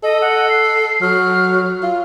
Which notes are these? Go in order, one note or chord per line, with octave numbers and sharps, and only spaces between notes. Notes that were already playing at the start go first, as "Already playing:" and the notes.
A4 D#5
F#5
C7
F#3 F6
F4